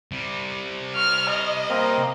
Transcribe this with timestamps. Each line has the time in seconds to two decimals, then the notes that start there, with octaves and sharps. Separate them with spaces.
0.12 C3 G3
0.96 C#6 F6
1.31 D#5
1.69 A#3 C4 A#4